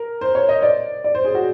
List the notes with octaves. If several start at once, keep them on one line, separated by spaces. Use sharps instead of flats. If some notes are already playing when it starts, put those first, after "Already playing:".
Already playing: A#4
C5
C#5
D#5
D5
D5
C5
G#4
F#4